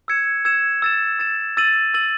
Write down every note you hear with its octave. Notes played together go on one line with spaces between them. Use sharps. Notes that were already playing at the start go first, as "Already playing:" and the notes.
E6 G#6 C#7 E7
E6 G#6 C#7 E7
E6 A6 E7
E6 A6 E7
E6 A6 D#7 F#7
E6 A6 D#7 F#7